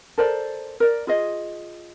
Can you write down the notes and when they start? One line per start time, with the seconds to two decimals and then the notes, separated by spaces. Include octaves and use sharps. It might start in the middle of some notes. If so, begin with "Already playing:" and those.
0.18 A4 A#4 C5 D5
0.80 A#4 D5
1.07 F4 G#4 D#5